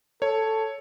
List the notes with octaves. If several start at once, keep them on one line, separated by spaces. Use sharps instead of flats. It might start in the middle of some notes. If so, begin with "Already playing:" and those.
A4 C#5